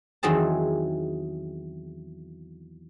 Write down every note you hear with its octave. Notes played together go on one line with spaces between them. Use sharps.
E2 D#3 F#3 C4 G#4 A5